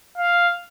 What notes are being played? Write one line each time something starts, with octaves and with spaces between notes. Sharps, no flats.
F5